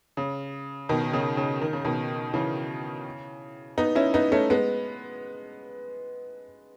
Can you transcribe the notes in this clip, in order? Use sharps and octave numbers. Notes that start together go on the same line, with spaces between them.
C#3
B2 D#3
C#3
C#3
D#3
C#3
B2 D#3
C#3 E3
B3 D#4
C#4 E4
B3 D#4
A3 C#4
G#3 B3